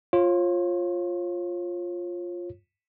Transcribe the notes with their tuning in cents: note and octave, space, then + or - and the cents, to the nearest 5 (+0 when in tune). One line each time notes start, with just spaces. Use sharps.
F4 +5 C#5 -35